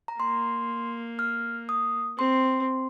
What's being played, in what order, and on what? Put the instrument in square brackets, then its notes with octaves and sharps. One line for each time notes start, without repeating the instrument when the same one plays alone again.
[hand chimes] A#5
[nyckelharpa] A#3 [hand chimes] C6
[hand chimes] F6
D#6
[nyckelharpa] C4 [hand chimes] C6